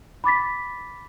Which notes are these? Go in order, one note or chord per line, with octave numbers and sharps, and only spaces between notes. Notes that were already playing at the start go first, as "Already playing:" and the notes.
B5 D6 A6 B6